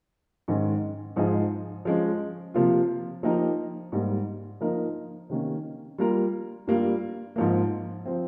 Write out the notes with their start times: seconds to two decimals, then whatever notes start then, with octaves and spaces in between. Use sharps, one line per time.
0.48 G#2 D#3 G#3 C#4
1.16 G#2 F3 G#3 D#4 G#4
1.85 F3 G#3 C#4
2.54 C3 F3 A#3 F4
3.23 F3 A#3 D#4 G4 A#4
3.92 G#2 G3 A#3
4.61 F3 A#3 D#4 A#4
5.30 C3 D#3 A#3 C#4
5.98 G3 A#3 F4 A#4
6.67 G2 G3 A#3 F4
7.36 G#2 F3 A#3
8.06 F3 C4